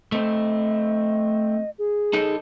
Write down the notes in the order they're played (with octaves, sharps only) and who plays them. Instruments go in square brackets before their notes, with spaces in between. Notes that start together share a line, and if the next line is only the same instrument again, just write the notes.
[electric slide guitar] A3 C4 [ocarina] D#5
[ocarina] G#4
[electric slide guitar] D#4 A4